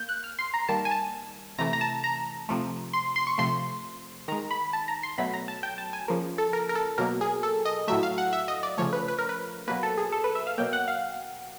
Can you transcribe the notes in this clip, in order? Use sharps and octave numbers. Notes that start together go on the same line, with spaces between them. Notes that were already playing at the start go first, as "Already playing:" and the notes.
Already playing: A#3 G6
F#6
F6
C6
A#5
D#3 G3 A#3 A5
G#5
A5
C3 E3 A3 A#5
A#5
A5
A#5
C3 F3 A3
C6
C6
C#6
C3 F3 A3 C6
D#3 G#3 A#5
B5
A5
A#5
C6
B2 F#3 A3 B5
A#5
A5
G5
A5
G#5
C#3 F3 A#3
A4
A#4
A#4
A4
B2 F#3 A#3 A#4
G#4
A4
D#5
A2 F#3 A3 E5
F5
F#5
E5
D#5
D5
C#3 F3 A3 C#5
B4
B4
A#4
B4
B2 F#3 A#3 B4
A4
G#4
A4
B4
E5
F5
B2 F#3 A#3 G5
F#5
F5